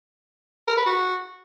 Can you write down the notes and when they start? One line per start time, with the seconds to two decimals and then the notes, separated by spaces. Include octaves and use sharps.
0.68 A#4
0.77 B4
0.86 F#4